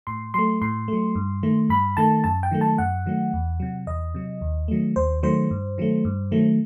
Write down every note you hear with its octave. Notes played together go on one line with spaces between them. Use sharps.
A2 C6
F#3 A3 C6
A2 C6
F#3 A3
G2
D#3 A3
G2 B5
D#3 A3 A5
F#2 A5
G5
D#3 F#3 A3
A5
F#2 F#5
D#3 F#3 A3
E2
C3 F#3
E2 D#5
C3 F#3
D#2
D#3 F#3 A3
D#2 C5
D#3 F#3 A3 C5
G2
D#3 F#3 A3
G2
D#3 F#3 A3